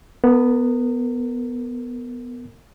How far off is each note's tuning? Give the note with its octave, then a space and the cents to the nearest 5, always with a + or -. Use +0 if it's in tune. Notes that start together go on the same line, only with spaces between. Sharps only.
B3 +0 A#4 -35